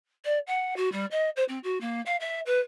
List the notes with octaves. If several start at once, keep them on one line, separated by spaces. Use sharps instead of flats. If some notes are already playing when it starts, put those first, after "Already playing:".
D5
F#5
F#4
G3
D#5
C5
C4
F#4
A#3
F5
E5
B4